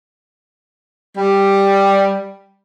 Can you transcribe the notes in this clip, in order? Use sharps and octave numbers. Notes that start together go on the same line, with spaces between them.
G3